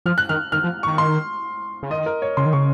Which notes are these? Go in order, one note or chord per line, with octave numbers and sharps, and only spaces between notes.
F3 F6
F#6
D#3 F6
D#3 F6
F3
D#3 C#6
C6
C#3
D#3 D#5
A#4
C#5
C#3 C6
D#3
C#3 C#6